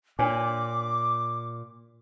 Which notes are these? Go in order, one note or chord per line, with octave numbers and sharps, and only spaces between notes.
A#2 D4 C#5 G#5 D6